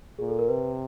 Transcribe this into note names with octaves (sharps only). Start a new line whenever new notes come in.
A#2 G#4
A4
A#4
C3 B4